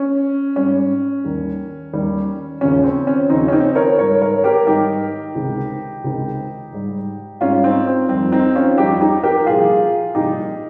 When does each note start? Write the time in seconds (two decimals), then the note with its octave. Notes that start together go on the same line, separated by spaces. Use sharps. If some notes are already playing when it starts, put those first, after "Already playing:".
Already playing: C#4
0.56 G#2 G3 C#4
1.25 D#2 D#3 G3
1.93 D#2 D#3 G3
2.61 D#2 C#3 F3 C#4
2.84 C4
3.07 C#4
3.30 D#2 C#3 F3 C4 D#4
3.48 C#4
3.53 C4 D#4
3.75 A#4 C#5
3.98 G#2 D#3 G3 A#4 C#5
4.21 A#4 C#5
4.44 G4 A#4
4.67 G#2 D#3 G3 D#4 G4
5.35 C#2 C3 D#3
6.04 C#2 C3 D#3
6.72 G#2 G3
7.41 G#2 G3 C#4 F4
7.64 C4 D#4
7.87 C4
8.09 F2 D#3 G3 C4
8.32 C4 D#4
8.55 C#4 F4
8.78 F2 D#3 G3 D#4 G4
9.01 D#4 G4
9.24 G4 A#4
9.46 C2 A#2 F3 F4 G#4
10.15 C2 A#2 F3 D#4 G4